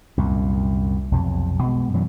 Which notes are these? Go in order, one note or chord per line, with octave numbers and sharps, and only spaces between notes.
C2 F#2 A#2
B1 F2 C3
B2 G#3
F#2 E3 F#3 G3